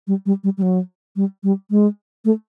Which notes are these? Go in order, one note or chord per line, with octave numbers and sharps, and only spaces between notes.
G3
G3
G3
G3
F#3
G3
G3
G#3
A3